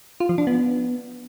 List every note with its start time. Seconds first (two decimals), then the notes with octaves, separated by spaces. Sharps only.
0.20 F4
0.29 F3
0.38 D4
0.47 B3